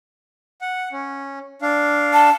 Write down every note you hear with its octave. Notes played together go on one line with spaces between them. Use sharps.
F#5
C#4
D4 F5
A5